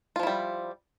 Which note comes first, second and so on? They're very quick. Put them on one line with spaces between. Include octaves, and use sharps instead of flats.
F4 F3 E4 G3